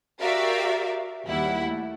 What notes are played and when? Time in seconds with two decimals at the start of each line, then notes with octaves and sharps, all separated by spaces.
0.20 F#4 G4 A#4 D5 E5 F5
1.26 D#2 G3 E4 F#5
1.64 A3